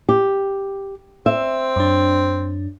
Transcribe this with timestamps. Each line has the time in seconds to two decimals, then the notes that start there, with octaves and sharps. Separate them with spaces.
0.09 G4
1.26 C4 E5
1.76 F#2 D4